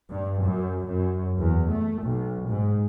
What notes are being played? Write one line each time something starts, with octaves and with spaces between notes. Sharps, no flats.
G2
F#2
F#2
E2
A3
B1
G#2